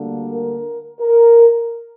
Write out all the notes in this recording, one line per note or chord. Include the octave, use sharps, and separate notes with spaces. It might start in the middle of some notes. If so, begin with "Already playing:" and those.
Already playing: D2 D3 G3 A#3
A#4
A#4